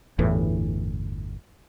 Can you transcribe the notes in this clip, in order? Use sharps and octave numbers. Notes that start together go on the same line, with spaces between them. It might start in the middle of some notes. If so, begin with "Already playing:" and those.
G1 E2 A2 E3